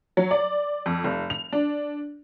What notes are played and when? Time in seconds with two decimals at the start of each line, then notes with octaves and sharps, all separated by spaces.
0.17 F#3
0.31 D5
0.86 F2
1.04 F1
1.30 F7
1.52 D4